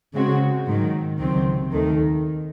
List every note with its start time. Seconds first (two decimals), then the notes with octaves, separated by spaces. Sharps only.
0.14 C#3 G#3 C4 F#4
0.67 G#2 D#3 F#3
1.19 C#2 C3 D#3 F#3 C4
1.72 D#2 D#3 A3